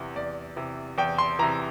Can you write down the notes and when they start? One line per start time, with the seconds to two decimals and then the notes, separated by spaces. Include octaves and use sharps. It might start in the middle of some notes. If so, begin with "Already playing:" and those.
Already playing: E2 C3 E3
0.16 E2 D5
0.56 C3 E3
0.98 E2 G5
1.18 C6
1.39 E3 A#5
1.42 C3